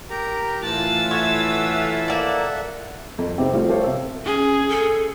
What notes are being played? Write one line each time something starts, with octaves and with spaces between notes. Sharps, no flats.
G4 A#4 A#5
A2 E3 F4 A5 E6 F#6 A6
A4 C#5 E5 F#5
A#3 D5
F2
G#2 C3 B3 C4 G4
F3 G3 A3 F4 F#4 C5
G4 A4 C5 C#5 F5
C3 E6
C#4 G#4
A4